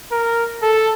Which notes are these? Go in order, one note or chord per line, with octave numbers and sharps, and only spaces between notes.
A#4
A4